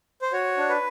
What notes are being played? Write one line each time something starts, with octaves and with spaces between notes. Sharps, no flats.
C5
F#4 C#5
D4
B4